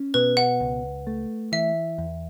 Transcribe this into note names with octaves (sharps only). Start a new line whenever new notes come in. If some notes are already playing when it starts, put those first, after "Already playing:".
Already playing: C#4
B2 B4
F#5
C#2
A3
E3 E5
E2